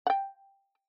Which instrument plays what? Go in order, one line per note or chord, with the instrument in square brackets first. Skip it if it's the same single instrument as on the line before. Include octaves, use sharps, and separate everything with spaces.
[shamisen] F#5 G5